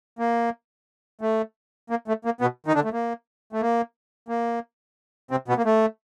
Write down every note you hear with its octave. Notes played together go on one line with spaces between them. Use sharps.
A#3
A3
A#3
A3
A#3
B2 B3
D#3 D#4
D3 D4
A3
A#3
A3
A#3
A#3
C3 C4
B2 B3
A#3
A3